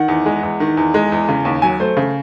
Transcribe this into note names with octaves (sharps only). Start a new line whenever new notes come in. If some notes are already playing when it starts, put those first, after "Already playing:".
Already playing: D#3 F#5
E2
G#3
E2
D#3
E2
G#3
E2
C#3
D#2
F#3 G#5
A3 C5
C#3